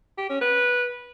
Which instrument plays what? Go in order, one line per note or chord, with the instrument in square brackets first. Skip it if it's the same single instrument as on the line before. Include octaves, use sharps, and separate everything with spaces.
[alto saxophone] G4
C#4
B4